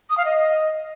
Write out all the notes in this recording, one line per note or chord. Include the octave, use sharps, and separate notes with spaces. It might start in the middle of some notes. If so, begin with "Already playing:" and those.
D#6
F5
D#5